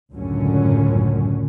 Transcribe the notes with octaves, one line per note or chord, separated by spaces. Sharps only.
C#2 F#2 A2 D3 F#3 C#4